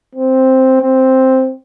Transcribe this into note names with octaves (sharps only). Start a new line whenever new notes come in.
C4
C4